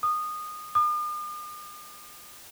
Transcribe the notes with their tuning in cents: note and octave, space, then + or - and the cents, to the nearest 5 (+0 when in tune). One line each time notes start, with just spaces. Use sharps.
D#6 -20
D#6 -45